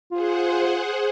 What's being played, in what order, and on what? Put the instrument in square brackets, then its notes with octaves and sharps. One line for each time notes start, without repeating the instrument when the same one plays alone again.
[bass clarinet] F4 [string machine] G#4 C5 F#5